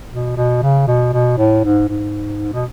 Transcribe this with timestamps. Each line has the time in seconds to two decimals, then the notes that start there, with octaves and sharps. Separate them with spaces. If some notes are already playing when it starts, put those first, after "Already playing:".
0.12 B2
0.37 B2
0.63 C#3
0.88 B2
1.13 B2
1.38 A2
1.64 G#2
1.88 G#2
2.53 B2